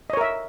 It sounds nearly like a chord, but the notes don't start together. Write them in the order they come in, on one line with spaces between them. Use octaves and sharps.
D#5 C#5 A#4 E5